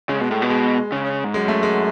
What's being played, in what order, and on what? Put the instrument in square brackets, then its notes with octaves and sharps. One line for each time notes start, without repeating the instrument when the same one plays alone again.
[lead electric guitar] C#3 [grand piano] G#3
[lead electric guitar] B2
A2
B2
[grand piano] G#3
[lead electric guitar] C#3
G#2
[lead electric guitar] F#2 [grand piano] G#3
[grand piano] A3
G#3